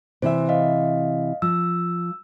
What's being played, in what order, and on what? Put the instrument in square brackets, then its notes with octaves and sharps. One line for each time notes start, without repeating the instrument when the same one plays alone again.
[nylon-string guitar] C3 E3 E5 [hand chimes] C5
[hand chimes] D#5 F5
[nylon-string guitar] F3 [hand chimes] E6